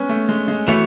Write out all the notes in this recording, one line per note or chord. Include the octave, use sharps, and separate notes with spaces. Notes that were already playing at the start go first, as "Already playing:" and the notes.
Already playing: G#3 B3 C#4
A3
G#3
G#3
E3 A3 B3 F#4 C#5